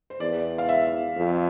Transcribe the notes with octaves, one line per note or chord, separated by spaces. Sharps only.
C5
E2 D5
F5
E5
F2